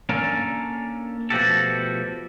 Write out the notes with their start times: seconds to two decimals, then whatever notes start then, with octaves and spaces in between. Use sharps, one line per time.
0.09 A#3 C#4 D4 A4 A#4 C#5
1.30 B2 F3 A3 F#4 G4 A4